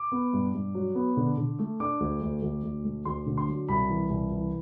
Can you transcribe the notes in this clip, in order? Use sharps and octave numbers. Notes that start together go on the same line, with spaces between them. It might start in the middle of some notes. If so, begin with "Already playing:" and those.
Already playing: D6
B3
G2
G2
F#3
B3
D3
D3
A3
D4 D6
D2
D2
D2
D2
A3
D2 C6
D3
C6
F#3
C2 B5
E3
C2
E3